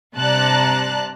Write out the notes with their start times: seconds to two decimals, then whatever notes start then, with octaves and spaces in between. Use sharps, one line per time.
0.16 G2 C3 D5 A5 A#5 F#6